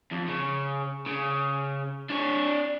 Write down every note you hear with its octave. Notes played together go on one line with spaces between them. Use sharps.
F2
C#3
C#3
D4 C#5